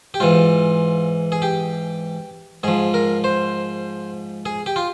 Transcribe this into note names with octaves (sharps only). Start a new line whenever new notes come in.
G4
G#2 E3 F4
G#4
G4
G#2 F3 G#4
A#4
C5
G#4
G4
F4